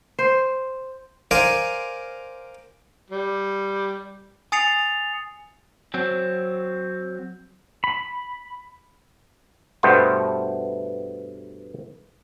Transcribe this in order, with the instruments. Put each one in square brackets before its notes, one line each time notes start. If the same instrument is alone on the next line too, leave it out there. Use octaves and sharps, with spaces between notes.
[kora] C5
[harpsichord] A#4 C5 D5 F5 G#5
[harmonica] G3
[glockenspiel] G#5 D#6 A6 C7 C#7 F7
[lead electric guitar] F#3 C4
[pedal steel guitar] B5
[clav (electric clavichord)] G2 B2 A3 B3 C5 G5